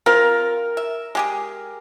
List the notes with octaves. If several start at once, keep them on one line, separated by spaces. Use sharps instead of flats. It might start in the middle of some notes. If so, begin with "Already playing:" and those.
C4 F4 A#4
E5
G#3 G4 G#4